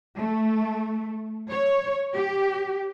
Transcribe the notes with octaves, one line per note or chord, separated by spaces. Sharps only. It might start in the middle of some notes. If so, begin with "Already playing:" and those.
A3
C#5
G4